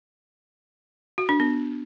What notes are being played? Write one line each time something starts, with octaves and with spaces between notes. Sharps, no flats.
F#4
D4
B3